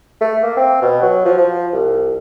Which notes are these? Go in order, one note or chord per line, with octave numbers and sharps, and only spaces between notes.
A3
A#3
C4
B2
F#3
F3
F3
C2